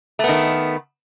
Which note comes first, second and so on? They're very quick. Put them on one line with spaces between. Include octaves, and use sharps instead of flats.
A3 B3 D#3